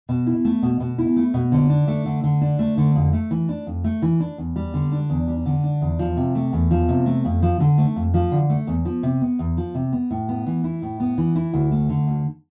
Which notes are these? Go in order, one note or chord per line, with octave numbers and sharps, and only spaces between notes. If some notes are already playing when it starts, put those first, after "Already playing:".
B2
E4
A3
B2
B2
E4
A3
B2
D3
D4
A3
D3
D3
D4
A3
D3
F2
A3
E3
D4
F2
A3
E3
D4
E2
G3
D3
D4
E2
G3
D3
D4
E2
F3
C3
A3
E2
F3
C3
A3
F2
F3
D3
A3
F2
F3
D3
A3
E2
F3
C3
B3
E2
F3
C3
B3
A2
B3
E3
E4
A2
B3
E3
E4
D2
A3
D3
D2